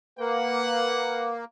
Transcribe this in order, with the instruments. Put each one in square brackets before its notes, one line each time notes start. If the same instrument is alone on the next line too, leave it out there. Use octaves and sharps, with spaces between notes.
[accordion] A#3 [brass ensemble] B4 F#5